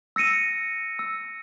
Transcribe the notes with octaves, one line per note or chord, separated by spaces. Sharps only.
E6 A#6 C#7 D#7 E7
E6